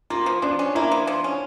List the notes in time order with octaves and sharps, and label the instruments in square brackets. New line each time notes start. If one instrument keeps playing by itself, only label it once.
[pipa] A#3 [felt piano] F4
[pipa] F3
[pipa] F3 [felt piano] D4
[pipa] C#4
[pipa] A#3 [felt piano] E4
[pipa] F3
F3
C#4